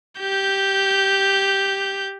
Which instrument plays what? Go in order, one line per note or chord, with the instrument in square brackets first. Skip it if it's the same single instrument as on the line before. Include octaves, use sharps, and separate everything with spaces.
[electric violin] G4 G6